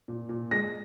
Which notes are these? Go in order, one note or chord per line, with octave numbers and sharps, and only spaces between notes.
A#2
A#2
G#3 A#6